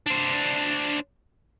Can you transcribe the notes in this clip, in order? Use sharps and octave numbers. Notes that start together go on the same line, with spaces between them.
D4 C5